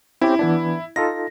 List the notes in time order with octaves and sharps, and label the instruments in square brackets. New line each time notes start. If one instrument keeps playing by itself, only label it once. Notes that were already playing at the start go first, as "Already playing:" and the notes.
[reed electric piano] C4 C#4 G4 [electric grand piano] E4
[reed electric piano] E3 B3 D4
[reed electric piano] D#4 F4 A4 [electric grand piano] A#6